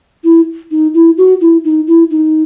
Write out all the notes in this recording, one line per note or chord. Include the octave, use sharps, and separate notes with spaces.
E4
D#4
E4
F#4
E4
D#4
E4
D#4